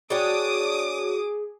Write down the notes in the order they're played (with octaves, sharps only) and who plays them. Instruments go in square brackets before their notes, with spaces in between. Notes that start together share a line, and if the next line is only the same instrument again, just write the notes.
[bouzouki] D4 C#5 G5 [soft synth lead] F#4 [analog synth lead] G#4 [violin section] D6 D#6